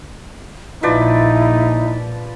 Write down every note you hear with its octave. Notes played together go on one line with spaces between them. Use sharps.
A#1 F3 D#4 E4 B4 D5